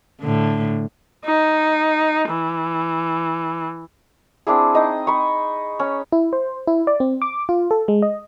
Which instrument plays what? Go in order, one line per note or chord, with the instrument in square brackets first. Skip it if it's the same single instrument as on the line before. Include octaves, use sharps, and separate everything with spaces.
[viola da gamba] A2 D3
[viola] D#4
E3
[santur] C4 D4 E4 G#4
D#4 D#5
B5 C#6
C#4
[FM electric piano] E4
C5
E4
D5
C4
D6
F4
A4
G#3
D#5